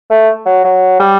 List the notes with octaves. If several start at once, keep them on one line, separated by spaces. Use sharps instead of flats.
A3
F#3
F#3
G3